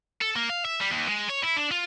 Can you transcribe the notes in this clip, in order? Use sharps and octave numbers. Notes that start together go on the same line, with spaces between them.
A4
A#3
F5
E5
G3
D#2
G#3
C#5
E4
D4
F4